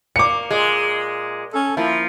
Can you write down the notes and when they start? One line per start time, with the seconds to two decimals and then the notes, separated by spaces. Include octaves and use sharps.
0.16 A#3 D6 C#7
0.51 A#2 G#3
1.54 C#4 A4
1.77 F3 A#3 E4